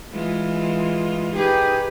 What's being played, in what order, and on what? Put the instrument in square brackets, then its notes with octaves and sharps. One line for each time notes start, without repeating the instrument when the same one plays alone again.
[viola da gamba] E3 G#3 F4
[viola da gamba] D#4 G#4 B4 [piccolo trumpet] G4